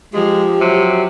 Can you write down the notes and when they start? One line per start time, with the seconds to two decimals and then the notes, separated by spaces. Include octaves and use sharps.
0.14 F3 G#3 G4
0.61 C3 F#3